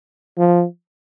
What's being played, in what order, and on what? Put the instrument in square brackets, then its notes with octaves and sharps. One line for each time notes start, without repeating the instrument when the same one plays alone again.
[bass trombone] F3